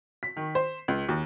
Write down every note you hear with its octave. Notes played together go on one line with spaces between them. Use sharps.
B6
D#3
C5
C#2
D#2